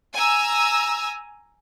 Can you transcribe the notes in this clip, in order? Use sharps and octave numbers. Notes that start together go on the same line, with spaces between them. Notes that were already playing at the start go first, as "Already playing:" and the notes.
G#5 A#5 E6